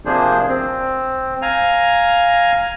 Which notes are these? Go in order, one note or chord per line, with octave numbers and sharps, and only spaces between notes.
C3 F3 A#3 D4 G#4 C5
C4
F5 G#5 A#5